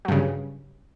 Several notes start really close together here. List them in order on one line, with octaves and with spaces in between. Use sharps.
F#3 G2 C#3